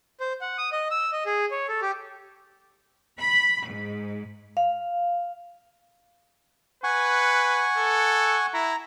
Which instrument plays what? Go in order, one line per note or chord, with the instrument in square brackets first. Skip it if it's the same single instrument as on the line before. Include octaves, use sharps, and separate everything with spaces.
[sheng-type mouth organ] C5
F#5
D#6
D#5
E6
D#5
G#4
C#5
A4
G4
[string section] B5
G#2
[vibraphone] F5
[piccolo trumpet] B4 [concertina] F#5 G#5 C#6
[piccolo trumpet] A4
[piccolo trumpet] E4 [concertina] A#5